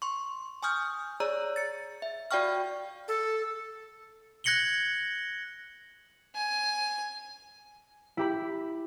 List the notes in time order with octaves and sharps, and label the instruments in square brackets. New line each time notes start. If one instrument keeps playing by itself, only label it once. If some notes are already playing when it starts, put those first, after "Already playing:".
[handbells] C6 C#6
G#5 C#6 D#6 F6 G6
G#4 C#5 D5 A#5 E6
A6 C#7
E5
F#4 D5 F5 G5 C#6 F6
[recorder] A4
[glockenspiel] F#6 G#6 A#6 C#7 F#7 G7
[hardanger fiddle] G#5
[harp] E4 G4 B5